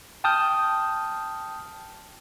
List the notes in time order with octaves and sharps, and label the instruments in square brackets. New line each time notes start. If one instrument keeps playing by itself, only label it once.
[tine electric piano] G5 A5 D#6 F6 G6